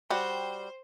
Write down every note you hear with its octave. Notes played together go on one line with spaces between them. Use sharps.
G3 F#4 C5 G5